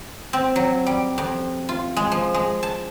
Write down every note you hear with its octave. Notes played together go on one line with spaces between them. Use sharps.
C4
F#3
G3
F2
F4
G#3
F3
G#3
A5